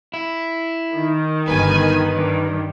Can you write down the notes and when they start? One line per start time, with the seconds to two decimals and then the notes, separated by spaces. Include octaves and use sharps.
0.14 E4
0.94 D#3
1.48 G1 B4 G#5
2.14 G2